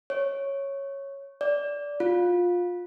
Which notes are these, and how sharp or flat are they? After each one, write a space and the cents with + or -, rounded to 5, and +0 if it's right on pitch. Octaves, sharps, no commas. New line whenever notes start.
C#5 -5
D5 -20
F4 +20